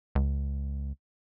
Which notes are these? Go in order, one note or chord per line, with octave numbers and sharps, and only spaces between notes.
C#2